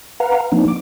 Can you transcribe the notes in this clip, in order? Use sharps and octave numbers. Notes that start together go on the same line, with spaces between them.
B4 F5 F#5 A#5
F3 A#3 C4 D4 D#4
D6